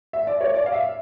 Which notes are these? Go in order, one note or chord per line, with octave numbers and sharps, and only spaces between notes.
E5
D5
C#5
D5
F5
E5